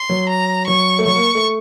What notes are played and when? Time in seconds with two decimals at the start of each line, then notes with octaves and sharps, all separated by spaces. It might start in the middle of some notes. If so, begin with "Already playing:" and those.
Already playing: C6
0.10 F#3
0.29 A#5
0.67 F#3 C#6
0.99 A3
1.05 F#3 C#6
1.15 A#3
1.35 A3